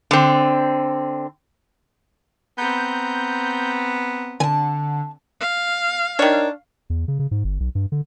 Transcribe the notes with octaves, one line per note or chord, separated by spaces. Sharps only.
D3 C4
B3 C4 A#5 G6
D3 G#5 A5
F5
D#3 D4 C#5
E2
C#3
C#3
G#2
G1
B1
G2
D3